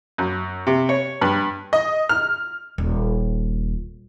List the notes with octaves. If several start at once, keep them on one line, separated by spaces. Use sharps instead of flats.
F#2
C3
C#5
G2
D#5
F6
D#1